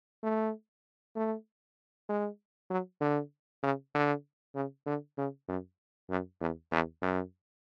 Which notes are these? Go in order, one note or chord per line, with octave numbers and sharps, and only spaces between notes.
A3
A3
G#3
F#3
D3
C#3
D3
C#3
D3
C#3
F#2
F#2
E2
E2
F#2